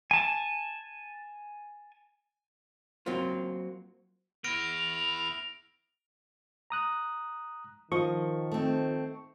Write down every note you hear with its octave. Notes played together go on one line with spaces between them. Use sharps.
G#5 A5
F#3 A#3 C4 F4
B3 E4 F6 A#6 D7 F7
A#5 D#6 F#6
D#3 F3 D#5 C#6
A3 C4